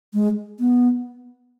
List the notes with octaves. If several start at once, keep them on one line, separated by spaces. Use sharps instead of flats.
G#3
B3